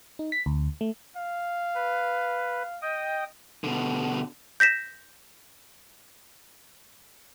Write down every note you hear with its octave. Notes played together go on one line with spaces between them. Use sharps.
D#4
B6
D2
A3
F5
B4
D#5 G5 D#6
B2 D3
G6 A#6 B6 E7